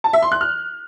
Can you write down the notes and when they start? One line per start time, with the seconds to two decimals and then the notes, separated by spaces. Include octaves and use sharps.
0.04 A5
0.13 E5
0.22 C6
0.32 F#6
0.41 F6